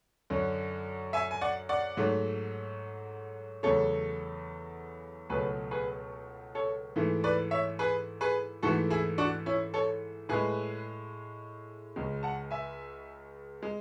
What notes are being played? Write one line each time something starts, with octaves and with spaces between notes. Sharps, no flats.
F#2 D3 F#3
E5 G#5
G#5
D5 F#5
D5 F#5
G#2 F#3 A3
E2 C#3 F#3 A3 A4 C#5
C#2 B2 F#3 A3 G#4 B4
G#4 B4
A4 C#5
G#2 E3 A3
B4 D5
C#5 E5
G#4 B4
G#4 B4
G#2 E3 A3 F#4 A4
E4 G#4
D4 F#4
C#4 E4
A4 C#5
A2 G#3 G#4 B4
C#2 C#3 G#3
F#5 A5
E5 G#5
G#3